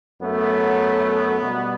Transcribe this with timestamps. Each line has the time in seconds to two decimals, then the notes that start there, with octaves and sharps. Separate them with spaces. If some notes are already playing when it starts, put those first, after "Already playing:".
0.20 F#2 F#3 A3 B3
1.41 B2 G3